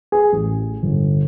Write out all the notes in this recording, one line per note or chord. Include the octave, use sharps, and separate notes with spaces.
G#4
A1
G1